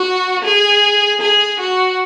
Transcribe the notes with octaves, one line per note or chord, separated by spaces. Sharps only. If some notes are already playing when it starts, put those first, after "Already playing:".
Already playing: F#4
G#4
G#4
F#4